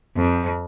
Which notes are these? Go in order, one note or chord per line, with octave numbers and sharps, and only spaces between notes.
F2